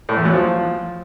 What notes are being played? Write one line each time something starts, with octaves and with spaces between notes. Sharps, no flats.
A2
E2
F#3
F3